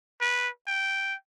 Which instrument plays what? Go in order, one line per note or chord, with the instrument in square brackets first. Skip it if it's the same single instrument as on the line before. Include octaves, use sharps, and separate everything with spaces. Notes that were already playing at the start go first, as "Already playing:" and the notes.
[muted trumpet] B4
G5